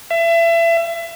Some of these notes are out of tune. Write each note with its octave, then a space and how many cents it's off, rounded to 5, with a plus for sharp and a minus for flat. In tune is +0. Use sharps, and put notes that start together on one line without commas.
E5 +30